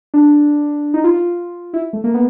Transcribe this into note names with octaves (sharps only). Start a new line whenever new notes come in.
D4
D#4
F4
F4
E4
A3
A#3
B3